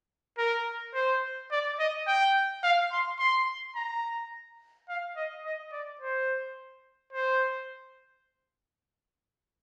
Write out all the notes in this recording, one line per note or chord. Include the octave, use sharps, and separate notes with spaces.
A#4
C5
D5
D#5
G5
F5
C6
C6
A#5
F5
D#5
D#5
D5
C5
C5